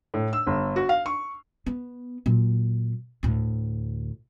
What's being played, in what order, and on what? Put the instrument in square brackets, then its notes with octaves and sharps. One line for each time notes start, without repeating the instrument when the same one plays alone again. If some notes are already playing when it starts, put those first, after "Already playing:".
[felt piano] A2
E6
G1
F#4
F5
C#6
[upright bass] B3
A#2 F#3
D2 A2